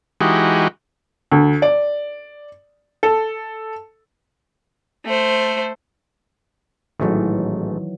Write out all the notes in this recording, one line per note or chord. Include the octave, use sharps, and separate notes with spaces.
E3 G#3 D#4 F#4 G4
D2
D5
A4
A3 C5
A1 G#2 D#3 E3 F#3 A3